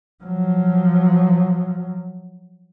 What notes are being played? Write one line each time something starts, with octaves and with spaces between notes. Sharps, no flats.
F3 F#3